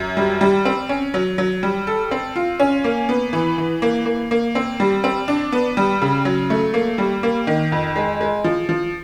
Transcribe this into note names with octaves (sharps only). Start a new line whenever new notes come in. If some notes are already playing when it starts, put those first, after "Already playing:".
Already playing: F#2
G3
G3
C4
C#4
F#3
F#3
G3
A4
C4
F4
C#4
A#3
B3
E3
E3
A#3
A#3
A#3
C4
G3
C4
D4
B3
G3
C#3
F#3
A3
A#3
G3
A#3
D#3
F2
G#3
G#3
F3
F3